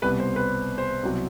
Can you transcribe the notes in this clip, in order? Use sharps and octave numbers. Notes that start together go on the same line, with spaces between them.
C2 B2 G3 B3 B4
C5
B4
C5
C2 B2 F#3 C4